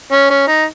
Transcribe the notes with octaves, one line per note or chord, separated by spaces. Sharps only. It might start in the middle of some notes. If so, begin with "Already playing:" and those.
C#4
C#4
D#4